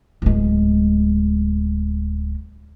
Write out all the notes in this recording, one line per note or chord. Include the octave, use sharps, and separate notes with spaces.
D1 G#3